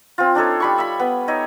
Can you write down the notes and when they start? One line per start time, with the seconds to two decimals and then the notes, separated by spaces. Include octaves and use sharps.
0.18 C4 F4
0.35 D4 D#4 A4 C#5
0.60 G3 B5 C#6
0.78 E5 B5
1.00 B3
1.28 D#4 C#5 D#5 E5